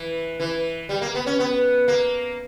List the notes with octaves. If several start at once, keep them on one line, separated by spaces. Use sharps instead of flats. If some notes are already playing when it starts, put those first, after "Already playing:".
Already playing: E3
E3
G3
A#3
B3
C#4
B3
A#3